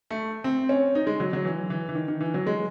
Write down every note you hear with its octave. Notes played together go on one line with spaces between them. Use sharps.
A3
C4
C#4
D#4
G#3
F#3
F#3
E3
E3
E3
D#3
D#3
E3
F#3
G#3